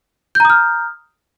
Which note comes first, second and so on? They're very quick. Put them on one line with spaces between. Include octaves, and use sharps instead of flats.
G6 A#5 D#6 F6